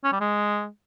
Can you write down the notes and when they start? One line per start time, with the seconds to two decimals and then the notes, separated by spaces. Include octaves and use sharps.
0.04 C#4
0.12 G3
0.21 G#3